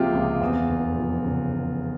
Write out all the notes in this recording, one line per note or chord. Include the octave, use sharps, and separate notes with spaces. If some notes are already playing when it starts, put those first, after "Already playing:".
Already playing: C#2 C3 F3 A#3 F4 G4 G#4
C#2
E2
F1
F3
C#3
E2